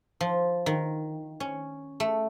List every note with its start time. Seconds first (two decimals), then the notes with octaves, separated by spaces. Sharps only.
0.21 F3
0.66 D#3
1.40 C#4
2.00 A3